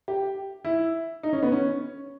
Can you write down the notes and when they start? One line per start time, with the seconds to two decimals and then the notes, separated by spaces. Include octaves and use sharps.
0.08 G4
0.65 E4
1.23 D#4
1.33 C#4
1.43 B3
1.52 C#4